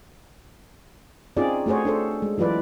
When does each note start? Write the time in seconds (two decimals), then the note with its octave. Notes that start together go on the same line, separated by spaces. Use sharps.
1.37 C4 C#4 D#4 F4 G#4 D5
1.66 A3 F#4 G#4 C5 C#5
1.85 D4 A4 C5
2.22 G#3
2.38 E3 F#3 F4 B4 D5